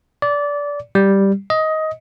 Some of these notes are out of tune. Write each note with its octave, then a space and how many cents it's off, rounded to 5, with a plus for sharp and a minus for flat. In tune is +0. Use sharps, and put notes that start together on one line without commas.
D5 -20
G3 +0
D#5 +15